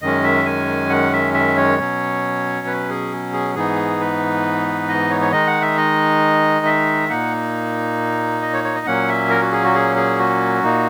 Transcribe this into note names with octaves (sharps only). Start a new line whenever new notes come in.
F#2 D#3 G#3 C#4 D#5
E5
G#5
F#5
E5
E5
C#5
B2 F#3 C#4
B4
G#4
G#4
G#2 E3 B3 D#4 G#4
B4
D#5
C#5
C#5
D#3 G#3 D#4 D#5
F#5
E5
D#5
E5
A#2 A#3 D#4 F#5
D#5
C#5
C#5
D#5
A#2 F#3 A#3 C#4 F#5
E5
A#4
F#4
G#4
F#4
G#4
G#4
F#4
A#2 A#3 D#4